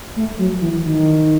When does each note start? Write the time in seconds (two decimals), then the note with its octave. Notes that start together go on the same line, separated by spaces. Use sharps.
0.16 A3
0.39 F#3
0.61 E3
0.84 D#3